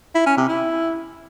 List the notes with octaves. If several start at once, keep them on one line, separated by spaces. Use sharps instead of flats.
E4
C#4
C3
E4